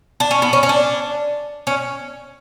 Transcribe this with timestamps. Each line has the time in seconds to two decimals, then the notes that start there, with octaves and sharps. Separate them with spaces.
0.20 D4
0.31 C#4
0.42 B3
0.53 C#4
0.63 C#4
0.69 D4
1.67 C#4